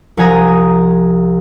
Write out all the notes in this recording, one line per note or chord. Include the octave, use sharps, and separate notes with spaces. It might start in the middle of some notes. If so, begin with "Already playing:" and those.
C2 F3 F#5 G#5 A#5 D#6